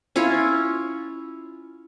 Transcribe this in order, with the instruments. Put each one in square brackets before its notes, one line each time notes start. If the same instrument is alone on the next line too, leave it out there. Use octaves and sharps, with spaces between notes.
[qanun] C#4 E4 F4 C#5